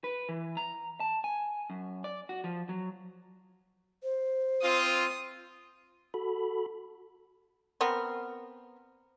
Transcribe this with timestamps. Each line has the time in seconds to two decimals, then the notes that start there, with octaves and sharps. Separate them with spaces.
0.04 B4
0.29 E3
0.57 A#5
1.00 A5
1.24 G#5
1.70 F#2
2.04 D5
2.29 F#4
2.44 F3
2.69 F#3
4.03 C5
4.63 C4 F4 D#6
6.14 F#4 A4 B5
7.81 B3 C4 A#4